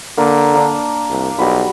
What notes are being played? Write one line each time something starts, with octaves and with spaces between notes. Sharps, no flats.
D3 A#3
A#3 D4
C2
B1 G3 F#4 B5